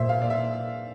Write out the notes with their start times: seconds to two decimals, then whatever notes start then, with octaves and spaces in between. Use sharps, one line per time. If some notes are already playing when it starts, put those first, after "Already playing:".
Already playing: A#2 C5 E5
0.09 F5
0.22 D5
0.30 E5